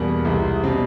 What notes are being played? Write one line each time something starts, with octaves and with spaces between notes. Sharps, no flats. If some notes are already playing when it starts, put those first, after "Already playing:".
Already playing: E2 B2 G3 A#3
C2 C3 E3 G#3
B2 G3 C4